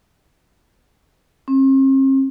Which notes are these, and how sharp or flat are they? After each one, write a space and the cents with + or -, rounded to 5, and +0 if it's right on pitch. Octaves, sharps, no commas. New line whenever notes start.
C4 +45